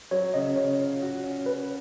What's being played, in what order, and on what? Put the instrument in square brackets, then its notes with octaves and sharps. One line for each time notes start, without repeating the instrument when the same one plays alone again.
[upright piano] F#3 [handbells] C#5
[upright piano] C#3 [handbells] D#5
[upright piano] C#3 [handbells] C#5
[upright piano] F4
F#4
C#4
[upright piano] C#4 [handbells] B4